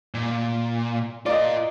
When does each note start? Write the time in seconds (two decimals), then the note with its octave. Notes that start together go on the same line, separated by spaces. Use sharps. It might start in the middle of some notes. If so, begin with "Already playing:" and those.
0.14 A#2
1.26 F4 A#4 D5 D#5